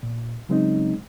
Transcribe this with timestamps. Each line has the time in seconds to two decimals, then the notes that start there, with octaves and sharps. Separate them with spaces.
0.03 A#2
0.49 C#3 F#3 G#3 C4 C#4 D#4